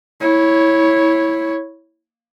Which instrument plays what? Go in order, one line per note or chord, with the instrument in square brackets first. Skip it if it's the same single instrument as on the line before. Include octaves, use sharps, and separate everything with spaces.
[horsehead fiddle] E4 C#5